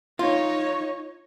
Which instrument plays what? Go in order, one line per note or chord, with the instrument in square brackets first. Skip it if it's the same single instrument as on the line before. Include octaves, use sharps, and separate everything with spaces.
[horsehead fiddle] D#4 C#5 [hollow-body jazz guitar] F4